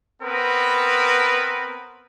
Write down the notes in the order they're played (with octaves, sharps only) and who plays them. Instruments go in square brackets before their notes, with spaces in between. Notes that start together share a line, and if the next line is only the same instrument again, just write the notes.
[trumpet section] B3 C4 A#4 B4